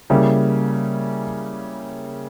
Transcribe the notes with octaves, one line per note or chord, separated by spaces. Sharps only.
C#3 G3 A#3 E4